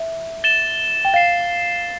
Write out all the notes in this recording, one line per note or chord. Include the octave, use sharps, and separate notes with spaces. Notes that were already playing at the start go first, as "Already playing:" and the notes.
Already playing: E5
A6 E7 G7
G5
F5 A6 C7 E7